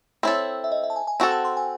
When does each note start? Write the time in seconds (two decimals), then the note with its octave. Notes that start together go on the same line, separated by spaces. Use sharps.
0.23 C4 E4 A4 C#5
0.64 E5
0.72 D#5
0.84 E5
0.90 A5
0.96 G#5
1.07 G#5
1.20 C4 F#4 A4 A5
1.32 A5
1.45 C6
1.57 G#5